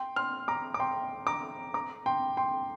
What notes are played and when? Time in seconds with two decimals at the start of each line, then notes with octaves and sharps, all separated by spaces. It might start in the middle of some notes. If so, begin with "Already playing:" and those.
Already playing: G5 C6
0.16 C6 F6
0.48 A#5 D6
0.74 D6
0.80 G5 C6
1.27 A#5 D6
1.74 A#5 D6
2.06 G5 C6
2.37 G5 C6